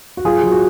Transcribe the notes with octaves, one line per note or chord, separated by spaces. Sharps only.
F#4
F#3 F4 G#4
F#3
F#4